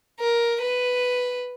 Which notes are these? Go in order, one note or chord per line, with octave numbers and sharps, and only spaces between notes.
A#4
B4